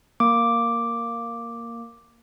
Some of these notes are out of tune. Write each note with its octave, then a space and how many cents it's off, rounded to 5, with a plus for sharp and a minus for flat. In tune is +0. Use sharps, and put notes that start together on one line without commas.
A#3 -5 D6 +0